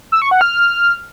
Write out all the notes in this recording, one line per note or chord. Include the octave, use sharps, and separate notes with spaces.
E6
C#6
F#5
F6